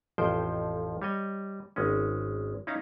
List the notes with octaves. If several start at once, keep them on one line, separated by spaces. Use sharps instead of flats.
A1 F2 F3 C5 G5
G3 C#5 D#5
G#1 G#3 C#4
C#4 D#4 E4 F5 A#5